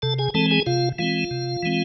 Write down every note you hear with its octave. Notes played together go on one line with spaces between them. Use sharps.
C3 A4 A5
G#4 G#5
E3 G#3 C4 A4 A5
G#4 G#5
C3 F4 F5
E3 G#3 C4 F4 F5
C3
E3 G#3 C4